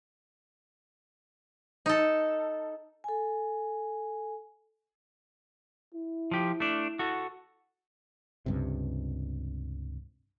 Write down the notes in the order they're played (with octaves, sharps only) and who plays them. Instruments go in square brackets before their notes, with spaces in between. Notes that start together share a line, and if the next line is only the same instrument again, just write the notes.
[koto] D#4 A4
[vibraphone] A4 G#5
[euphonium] E4
[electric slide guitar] F3 G4
A3 D4
F#4 A4
[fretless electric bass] C#2 G2 C3